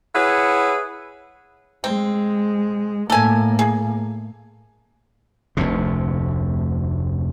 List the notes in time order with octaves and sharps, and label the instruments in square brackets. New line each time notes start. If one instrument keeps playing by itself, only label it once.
[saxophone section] E4 G#4 B4 C#5 F#5
[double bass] G#3 [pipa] C4
[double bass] A2 A#3 [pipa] A4 G#5
[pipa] G#4
[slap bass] F1 D2 C3